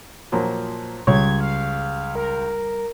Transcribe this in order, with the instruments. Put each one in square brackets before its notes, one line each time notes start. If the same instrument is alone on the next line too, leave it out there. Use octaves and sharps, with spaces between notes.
[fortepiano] A#2 F3 F#3
[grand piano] C#2 [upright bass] G3 [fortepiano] C#5 [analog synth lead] G#6
[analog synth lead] F5
A#4